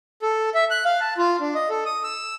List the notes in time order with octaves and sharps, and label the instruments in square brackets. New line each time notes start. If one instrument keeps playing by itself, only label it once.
[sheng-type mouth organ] A4
E5
F#6
F5
A5
F4
D4
D#5
A4
D#6
E6